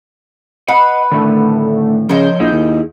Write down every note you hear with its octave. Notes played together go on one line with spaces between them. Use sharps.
B4 D#5 F#5
A2 D3 D#3 A3
C#3 F3 A#4 C5 C#5 D#5 G6
A#1 E4 G#4 D#5
D#2